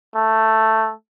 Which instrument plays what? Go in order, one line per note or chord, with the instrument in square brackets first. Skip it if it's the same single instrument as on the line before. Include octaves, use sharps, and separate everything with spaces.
[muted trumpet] A3